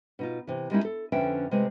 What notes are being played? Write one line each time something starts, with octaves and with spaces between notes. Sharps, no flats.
B2 D#4 F4
C3 E3
G3 G#3 A#3 C#4 D#4 E4
A4
F2 D3 C#4 B4 E5 G5
C3 G#3 A3 B4